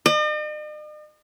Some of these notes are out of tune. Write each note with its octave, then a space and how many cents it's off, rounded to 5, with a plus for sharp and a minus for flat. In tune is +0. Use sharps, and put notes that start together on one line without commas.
D#5 -45